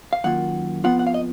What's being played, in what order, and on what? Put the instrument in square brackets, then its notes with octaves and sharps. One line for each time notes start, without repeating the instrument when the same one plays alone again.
[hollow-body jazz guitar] F5
F#2 D#3 A#3 F4 F#5
F2 F3 B3 F4 F#5
F#5
F5
D#5